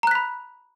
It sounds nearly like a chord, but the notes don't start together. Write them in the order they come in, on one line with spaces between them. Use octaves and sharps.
A#5 F#6 B6 B5